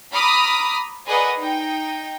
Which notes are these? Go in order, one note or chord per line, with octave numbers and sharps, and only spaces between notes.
A#5 B5 D6 D#6 F6 B6
G#4 A#4 B4 D5 D#5 F#5
D#4 G5